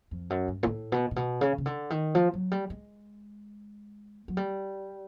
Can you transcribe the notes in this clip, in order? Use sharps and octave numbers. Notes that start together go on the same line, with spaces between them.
F2
F#2
G2
A#2
A2
B2
A#2
B2
C#3
C#3
D3
D#3
F3
F#3
G3
G#3
F#3
G3